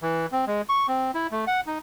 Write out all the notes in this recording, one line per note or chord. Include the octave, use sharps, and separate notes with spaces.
E3
C4
G#3
C#6
C4
E4
A3
F#5
D#4